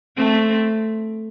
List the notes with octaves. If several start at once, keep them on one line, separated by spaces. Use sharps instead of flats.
A3 C4